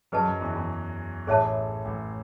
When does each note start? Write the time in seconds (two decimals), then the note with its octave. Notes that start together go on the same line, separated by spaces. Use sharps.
0.12 F#2 F#3 G#4 B4 D#5 A5
0.26 F#2 F#3
0.41 E2 E3
0.55 E2 E3
1.27 A1 A2 G#4 C#5 E5 A5
1.85 A1 A2